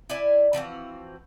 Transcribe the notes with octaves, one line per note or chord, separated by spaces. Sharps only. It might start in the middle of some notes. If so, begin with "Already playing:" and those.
E4 D5 G#5
E3 F3 C4 F#4